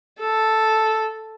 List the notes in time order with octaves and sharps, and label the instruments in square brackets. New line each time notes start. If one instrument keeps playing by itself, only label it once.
[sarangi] A4